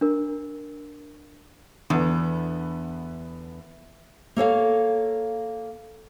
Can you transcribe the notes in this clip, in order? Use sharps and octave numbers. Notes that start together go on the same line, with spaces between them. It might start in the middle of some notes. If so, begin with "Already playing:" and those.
D4 A#4
E2 D3 B3
A#3 A4 C#5 F5